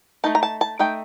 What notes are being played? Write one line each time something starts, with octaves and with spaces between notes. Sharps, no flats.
A3 D#4 A5
A#5
A5
A5
A3 D#4 G5